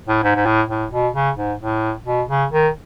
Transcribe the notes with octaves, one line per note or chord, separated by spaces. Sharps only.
A2
G#2
G#2
A2
A2
B2
C#3
G#2
A2
B2
C#3
D#3